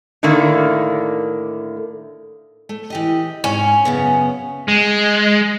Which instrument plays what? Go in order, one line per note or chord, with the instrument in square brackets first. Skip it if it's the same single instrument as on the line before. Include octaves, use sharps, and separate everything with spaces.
[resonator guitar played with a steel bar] A2 D3 D#3 A3 A#3
[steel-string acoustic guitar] A3
E3 G4 D#5
[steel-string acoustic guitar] G#2 [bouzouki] C#4
[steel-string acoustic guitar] F#2 C#3 B3
[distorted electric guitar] G#3